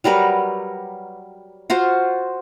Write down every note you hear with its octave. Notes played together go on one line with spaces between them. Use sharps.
F#3 G3 A#4 B4
F4 F#4 C5